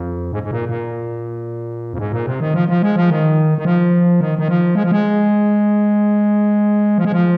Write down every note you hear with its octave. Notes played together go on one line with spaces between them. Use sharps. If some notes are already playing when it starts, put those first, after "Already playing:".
Already playing: F2
G#2
G#2
A#2
A#2
F2
G#2
A#2
C3
D#3
F3
F3
G#3
F3
D#3
D#3
F3
D#3
D#3
F3
G#3
F3
G#3
F3
G#3
F3